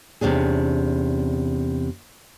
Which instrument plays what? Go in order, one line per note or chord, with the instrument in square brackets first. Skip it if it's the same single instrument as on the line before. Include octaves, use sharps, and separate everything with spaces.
[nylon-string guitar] E2 C3 C#4 D4 G#4